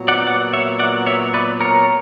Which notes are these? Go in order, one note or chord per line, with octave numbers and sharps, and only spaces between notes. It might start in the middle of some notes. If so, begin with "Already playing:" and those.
Already playing: A#2 F#3 B3
D5 F#5
D5 F#5
C#5 E5
D5 F#5
C#5 E5
B4 D5
A#4 C#5